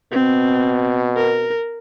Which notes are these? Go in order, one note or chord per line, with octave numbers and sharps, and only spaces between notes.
B2 C4
A#4